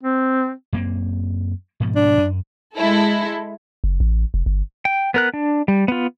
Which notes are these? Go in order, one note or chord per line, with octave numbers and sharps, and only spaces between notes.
C4
F#2 A#3 C4
G#2 B2 F3
D4
F#2
G#3 E4 A4
F#1
A1
F1
G1
G5
B3 A#4 F#6
D4
G3
B3 F4